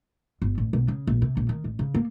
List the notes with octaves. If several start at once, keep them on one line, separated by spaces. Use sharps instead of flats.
G1
A1
B1
C#3
A#1
C3
A#1
D#3
A1
C#3
A#3